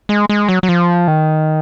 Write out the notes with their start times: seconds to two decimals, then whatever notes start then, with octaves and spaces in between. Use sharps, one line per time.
0.09 G#3
0.29 G#3
0.49 F#3
0.63 F#3
0.69 F3
1.08 D#3